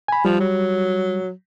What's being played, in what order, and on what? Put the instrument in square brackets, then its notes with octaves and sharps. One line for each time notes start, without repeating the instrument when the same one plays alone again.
[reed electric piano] G#5 B5
[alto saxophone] F3 [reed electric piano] G3
[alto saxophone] F#3